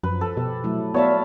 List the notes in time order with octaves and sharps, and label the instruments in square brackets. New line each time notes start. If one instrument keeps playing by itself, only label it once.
[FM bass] F#2 [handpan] F3 [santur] B4
[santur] A4
[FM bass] B2 [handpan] G4
[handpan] F#3 A3 E4
[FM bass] B3 [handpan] F#4 E5 F5 [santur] C#5 A5 B5 [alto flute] D5